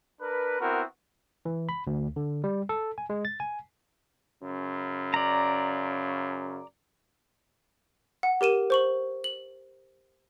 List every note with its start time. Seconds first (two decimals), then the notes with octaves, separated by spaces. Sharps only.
0.22 D4 A#4 B4
0.61 B3 C4 E4 F#4 A#4
1.45 E3
1.69 B5
1.87 D2
2.16 D3
2.44 G3
2.69 A4
2.98 G#5
3.10 G#3
3.25 A6
3.40 G#5
4.43 F#2 C#3
5.14 D5 A#5
8.23 F#5
8.41 G4 A#4 D#7 E7
8.70 C5 C#6 F#7
9.24 F#7